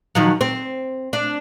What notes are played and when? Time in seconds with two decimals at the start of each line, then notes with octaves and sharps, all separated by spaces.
0.15 D#3 F3 F#3
0.41 C4
1.13 D4